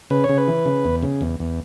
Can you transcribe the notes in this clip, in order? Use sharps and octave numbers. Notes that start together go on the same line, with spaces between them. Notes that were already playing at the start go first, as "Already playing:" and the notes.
C#3 B4
C#5
C#3
B4
E3
C#3
E2
C#3
E2
E2